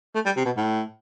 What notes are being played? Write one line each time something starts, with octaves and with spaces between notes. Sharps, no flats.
A3
G3
C3
B2
A2